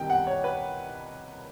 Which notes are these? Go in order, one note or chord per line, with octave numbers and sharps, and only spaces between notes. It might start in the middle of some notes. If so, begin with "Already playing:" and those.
Already playing: C2 C3 D#3 G3 G5
F#5
C#5
B4